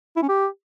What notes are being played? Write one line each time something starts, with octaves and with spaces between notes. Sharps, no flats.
E4
C#4
G4